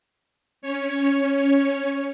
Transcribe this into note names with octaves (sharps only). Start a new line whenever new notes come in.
C#4 C#5